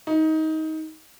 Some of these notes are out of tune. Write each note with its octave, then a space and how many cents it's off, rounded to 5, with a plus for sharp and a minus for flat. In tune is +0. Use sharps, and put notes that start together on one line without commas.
D#4 +20